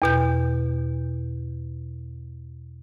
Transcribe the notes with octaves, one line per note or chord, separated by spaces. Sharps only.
E2 B2 G6